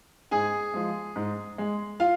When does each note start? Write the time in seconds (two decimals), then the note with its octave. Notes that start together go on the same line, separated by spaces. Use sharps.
0.31 G#2 G#4 G#5
0.74 F3 G#3
1.16 G#2
1.58 G#3
2.00 F4 F5